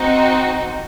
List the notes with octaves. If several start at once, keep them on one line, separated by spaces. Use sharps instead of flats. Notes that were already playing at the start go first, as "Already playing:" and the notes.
Already playing: C4 D#4 F#4